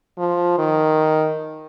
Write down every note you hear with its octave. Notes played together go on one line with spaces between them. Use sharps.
F3
D#3